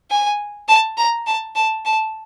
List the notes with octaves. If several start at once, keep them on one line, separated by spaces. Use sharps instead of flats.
G#5
A5
A#5
A5
A5
A5